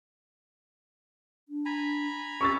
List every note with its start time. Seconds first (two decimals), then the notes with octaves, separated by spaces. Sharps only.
1.49 D4
1.66 G#5 A#5 B5
2.41 C#4 C#6 E6 A6